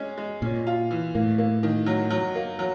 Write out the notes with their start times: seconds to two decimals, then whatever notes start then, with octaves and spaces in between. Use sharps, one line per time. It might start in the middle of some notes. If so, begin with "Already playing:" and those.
Already playing: G#3 C#4
0.17 G#3
0.42 A#2 C#4
0.67 F4
0.91 E3
1.15 A2 A#3
1.38 A#3
1.63 D#3
1.86 F#3
2.10 F#3
2.35 A#3
2.59 F#3